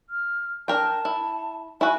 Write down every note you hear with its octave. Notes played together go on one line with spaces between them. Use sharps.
F6
D4 A#4 G5 A5
E4
E4 F#4 G#5